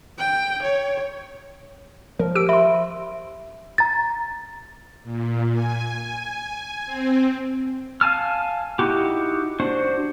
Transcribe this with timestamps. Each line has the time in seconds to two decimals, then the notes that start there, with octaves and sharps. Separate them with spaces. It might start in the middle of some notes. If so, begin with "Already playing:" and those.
0.18 G5
0.63 C#5
2.19 F3 A#4
2.35 G4 E6 D7
2.49 E5 B5 C6
3.78 A#5 A6
5.04 A#2
5.53 G#5
6.86 C4
8.01 F5 G#5 A5 F6
8.79 D#4 E4 F#4 G4
9.60 D4 F#4 C5